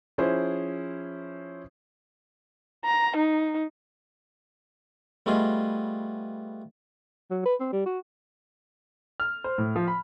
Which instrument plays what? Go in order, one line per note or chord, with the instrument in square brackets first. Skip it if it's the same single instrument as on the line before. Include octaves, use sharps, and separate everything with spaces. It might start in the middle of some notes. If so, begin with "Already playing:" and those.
[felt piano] F3 C#4 E4 G#4 C5
[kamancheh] A#5
D#4
[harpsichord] G3 A3 B3 F4 G#4 D#5
[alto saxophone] F#3
B4
C4
G3
F#4
[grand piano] F6
C5
A2
F3
B5